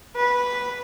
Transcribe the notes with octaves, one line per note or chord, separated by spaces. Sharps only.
B4